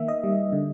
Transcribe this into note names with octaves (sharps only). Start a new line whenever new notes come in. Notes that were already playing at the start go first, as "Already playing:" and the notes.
Already playing: D#3 A#3 E5
D#5
G3
D3